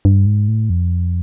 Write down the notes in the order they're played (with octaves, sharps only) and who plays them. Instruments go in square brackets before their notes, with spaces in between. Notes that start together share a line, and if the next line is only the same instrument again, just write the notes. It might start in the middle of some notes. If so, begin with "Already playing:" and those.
[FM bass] G2
G#2
A2
F2